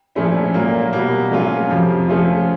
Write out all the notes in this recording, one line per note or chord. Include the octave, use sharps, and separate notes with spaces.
A#2 F3 A3 C#4 E4
A#2 F#3 A#3
B2 G3 A#3
F#3 A3 C#4 F4
F2 C3 F3
F3 A3 C#4 F4